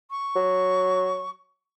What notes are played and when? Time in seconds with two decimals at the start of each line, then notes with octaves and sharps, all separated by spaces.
0.11 C#6
0.36 F#3